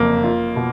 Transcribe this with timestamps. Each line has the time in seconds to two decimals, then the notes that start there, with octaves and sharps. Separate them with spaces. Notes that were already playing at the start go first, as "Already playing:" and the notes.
Already playing: F#1 F2 A#3
0.24 F4
0.56 B2